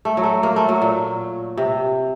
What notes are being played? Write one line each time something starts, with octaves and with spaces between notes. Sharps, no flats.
A3
F#3
A3
A#3
A3
F#3
A#2
C3